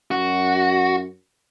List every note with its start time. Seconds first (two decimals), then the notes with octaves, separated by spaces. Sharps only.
0.11 F#2 F#4